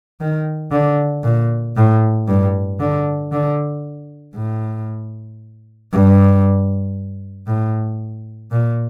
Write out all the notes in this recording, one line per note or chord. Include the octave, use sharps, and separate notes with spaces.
D#3
D3
A#2
A2
G2
D3
D3
A2
G2
A2
A#2